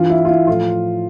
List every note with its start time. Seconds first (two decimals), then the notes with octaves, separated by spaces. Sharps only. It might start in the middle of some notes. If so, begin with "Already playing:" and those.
Already playing: G2 E3 F4
0.10 E4
0.25 F4
0.28 E4
0.47 A2 F3 F4